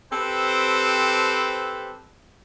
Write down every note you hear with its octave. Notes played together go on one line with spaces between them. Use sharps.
C4 G4 A4 B4 C5